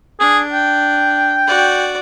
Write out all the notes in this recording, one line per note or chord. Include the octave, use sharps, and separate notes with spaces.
D4 G#4
G5
F#4 D5